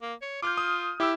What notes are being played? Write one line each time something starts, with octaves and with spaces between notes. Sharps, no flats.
A#3
C#5
F4 D6 F6 G6
D#6
E4 G4 E6